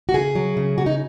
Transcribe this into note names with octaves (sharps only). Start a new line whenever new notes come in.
F#4
C#3 G#4
F#3
C#3
C#3 F#4
D#4